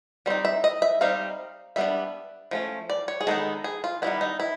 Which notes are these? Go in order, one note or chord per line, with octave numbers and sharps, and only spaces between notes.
G3 C4 D#4
E5
D#5
E5
G3 C4 D#4 F5
G3 B3 D4 E5
F3 A3 C#4
D5
C#5
G#4
D#3 G#3 B3 D#4 A4
G#4
F4
D#3 G3 B3 E4
D#4
E4